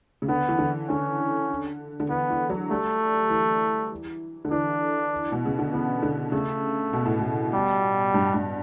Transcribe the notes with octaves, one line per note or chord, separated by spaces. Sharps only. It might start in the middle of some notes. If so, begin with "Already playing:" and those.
C#3
D3 B3
E3
D3
D3 C#4
D3
E3 B3
E3
F#3
G3 A3
E3
D3
E3 D4
B2
C#3
D3
E3 B3
D3
C#3 A3
B2
A2
B2
G3
G2
G2